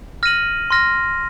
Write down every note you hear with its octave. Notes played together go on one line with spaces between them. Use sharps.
F6 A#6 D#7 F#7
C6 F6 A#6